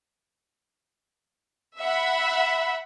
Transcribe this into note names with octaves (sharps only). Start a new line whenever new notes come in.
E5 F#5 B5